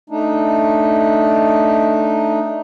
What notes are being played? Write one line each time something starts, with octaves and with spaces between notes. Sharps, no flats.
A3 D4 D#4